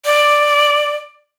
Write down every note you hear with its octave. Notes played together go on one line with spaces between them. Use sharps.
D5